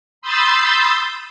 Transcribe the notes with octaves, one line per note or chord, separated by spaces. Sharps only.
B5 C6 D#6 E6 G6 A6